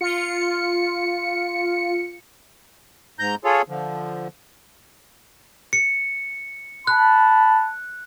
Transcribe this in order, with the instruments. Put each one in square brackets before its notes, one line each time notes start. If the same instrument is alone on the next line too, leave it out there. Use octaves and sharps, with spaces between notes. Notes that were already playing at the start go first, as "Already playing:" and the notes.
[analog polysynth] F4 C#7
[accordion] G#2 A#5 G6
F4 G#4 A4 C#5
D3 F3
[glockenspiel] C#7
[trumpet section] A5 B5 [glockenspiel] F#6